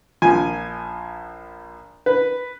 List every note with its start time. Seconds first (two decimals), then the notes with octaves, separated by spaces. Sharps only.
0.22 A#1 F3 G#5
2.06 B4